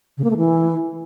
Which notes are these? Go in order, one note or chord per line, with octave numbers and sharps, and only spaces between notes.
C#3
A#3
A3
E3